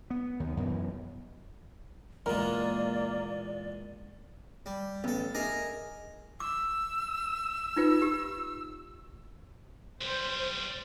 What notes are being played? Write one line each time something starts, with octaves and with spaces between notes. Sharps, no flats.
B3
D#2 D#3
F#2 B2 E3
E2 A#2 G#3 A#3 A#4 D5
G3
A1 B3 A4
D4 G#4 A#4 D#5 E5 G#5
D6 E6
D#4 F4 B4
G4
B1 G3 C5